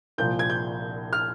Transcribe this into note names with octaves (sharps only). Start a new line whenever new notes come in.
C2 A#2 F3 G6
G#6
G6
F6